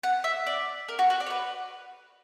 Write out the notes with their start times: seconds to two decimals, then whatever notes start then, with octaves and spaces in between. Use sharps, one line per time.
0.03 F#5
0.24 E5
0.46 D5
0.88 A#4
0.99 F#4
1.10 F#4
1.20 D5
1.26 C#5
1.30 B4